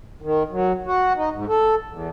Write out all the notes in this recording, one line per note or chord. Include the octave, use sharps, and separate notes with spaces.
D#3
F#3
F#4
D#4
G#2
A4
E2